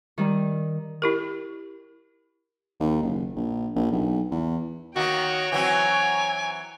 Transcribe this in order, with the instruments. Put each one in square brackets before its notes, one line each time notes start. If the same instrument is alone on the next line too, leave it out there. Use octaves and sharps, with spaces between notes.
[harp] D#3 G3
[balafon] E4 G4 A#4
[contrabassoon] D#2
F#1
A#1
A#1
B1
E2
[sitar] D#3 A#3 [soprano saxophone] F#4 [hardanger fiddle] C#5 G5
[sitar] E3 F#3 C4 [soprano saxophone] G#5